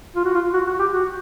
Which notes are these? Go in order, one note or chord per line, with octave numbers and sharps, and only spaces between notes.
F4
F#4
F4
F#4
F#4
G4
F#4